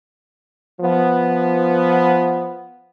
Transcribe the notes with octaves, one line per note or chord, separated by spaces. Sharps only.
F3 B3